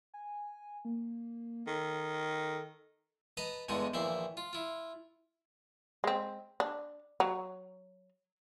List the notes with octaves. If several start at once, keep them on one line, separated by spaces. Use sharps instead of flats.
G#5
A#3
D#3 A4
B4 D#5 A5 A#5
E2 G2 D3 G#3 D#4
A#1 D#2 E3 E5 C6
F4
E4 F4
G#3 C4
D4
F#3